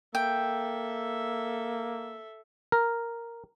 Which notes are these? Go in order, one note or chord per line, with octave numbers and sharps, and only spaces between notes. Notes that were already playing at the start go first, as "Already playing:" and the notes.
A#3 A4 E5 G5
A#4